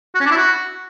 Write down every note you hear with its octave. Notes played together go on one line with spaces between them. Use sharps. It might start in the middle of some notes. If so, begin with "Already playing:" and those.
F#4
C#4
D4
E4
F#4